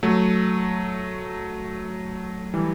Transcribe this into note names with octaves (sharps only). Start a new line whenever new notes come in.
F#3 A3
E3 G3